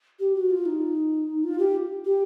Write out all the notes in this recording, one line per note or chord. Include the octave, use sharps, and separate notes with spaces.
G4
F#4
F4
D#4
F4
G4
G4